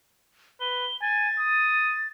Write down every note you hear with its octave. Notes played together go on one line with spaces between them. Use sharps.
B4 G7
G#5 A6
D#6